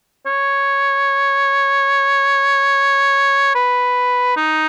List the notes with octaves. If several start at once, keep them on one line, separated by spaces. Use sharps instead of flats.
C#5
B4
D#4